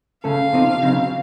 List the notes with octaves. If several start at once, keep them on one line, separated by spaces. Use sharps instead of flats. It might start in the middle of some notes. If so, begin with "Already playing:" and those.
C#3 A3 C#4 A4 F5
C3 F3 C4 D#4
C#3 F#3 C4 D#4